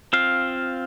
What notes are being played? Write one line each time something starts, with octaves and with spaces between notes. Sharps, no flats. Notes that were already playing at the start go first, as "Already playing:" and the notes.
C4 F4 F5